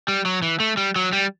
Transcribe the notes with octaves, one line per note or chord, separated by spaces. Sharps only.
G3
F#3
E3
A3
G3
F#3
G3